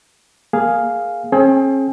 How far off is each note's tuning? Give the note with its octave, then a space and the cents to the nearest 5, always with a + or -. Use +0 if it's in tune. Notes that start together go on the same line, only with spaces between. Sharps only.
A#3 +0 G#4 +0 F5 +0
C#4 -45 G#4 +35 G5 +30